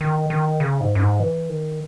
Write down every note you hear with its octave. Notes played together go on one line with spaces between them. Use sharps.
D#3
D#3
C#3
G#2
F#2
G#2
E3
D#3